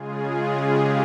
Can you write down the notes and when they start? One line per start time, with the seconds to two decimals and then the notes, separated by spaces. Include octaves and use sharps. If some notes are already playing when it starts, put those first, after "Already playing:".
Already playing: C#3 G#3 F4 G#4
0.58 G4